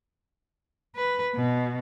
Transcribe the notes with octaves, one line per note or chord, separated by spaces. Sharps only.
B4
B2